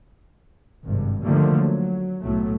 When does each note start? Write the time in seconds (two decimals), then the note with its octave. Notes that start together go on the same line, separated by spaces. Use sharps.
0.85 G#1 G2 C3
1.23 D3 D#3 F3 G3 A3 A#3
1.58 F#3
2.21 B1 A2 F#3 A3